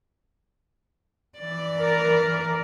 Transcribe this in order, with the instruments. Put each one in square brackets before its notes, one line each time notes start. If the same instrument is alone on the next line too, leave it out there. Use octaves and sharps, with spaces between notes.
[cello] E3 D5
[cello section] A#4